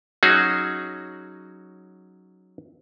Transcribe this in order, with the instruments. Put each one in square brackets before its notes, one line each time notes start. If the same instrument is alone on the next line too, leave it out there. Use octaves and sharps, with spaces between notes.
[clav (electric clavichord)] F#3 C#4 D#4 F#4 G#4